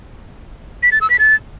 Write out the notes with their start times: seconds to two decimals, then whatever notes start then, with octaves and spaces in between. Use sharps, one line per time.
0.83 B6
0.92 A6
1.01 E6
1.10 B6
1.19 A6